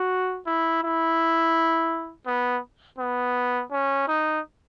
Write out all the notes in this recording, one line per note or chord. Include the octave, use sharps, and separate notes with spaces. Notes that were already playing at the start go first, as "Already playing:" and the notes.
Already playing: F#4
E4
E4
B3
B3
C#4
D#4